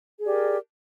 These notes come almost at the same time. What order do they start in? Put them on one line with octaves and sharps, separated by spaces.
G#4 G4 D5 A#4